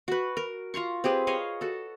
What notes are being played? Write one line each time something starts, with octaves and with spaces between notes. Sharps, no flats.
F#4 B4
A#4
F4 A#5 C6 C#6
C4 G4 G#4 B4
G#4 C#5 D#5 F5
F#4 A4